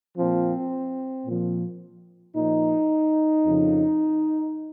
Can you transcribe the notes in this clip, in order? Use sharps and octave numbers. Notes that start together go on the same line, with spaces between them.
A#2 F3 C4
A#2 F3
A#2 F3 D#4
F2 C#3 F3